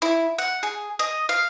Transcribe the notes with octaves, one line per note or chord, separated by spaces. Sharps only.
E4
F#5
G#4
D#5
F5